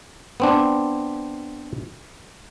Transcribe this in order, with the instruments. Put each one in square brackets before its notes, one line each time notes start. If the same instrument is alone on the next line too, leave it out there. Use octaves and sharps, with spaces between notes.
[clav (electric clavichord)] B3 C4 D4